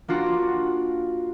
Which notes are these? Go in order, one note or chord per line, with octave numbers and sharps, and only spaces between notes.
A#3 D4 F4 F#4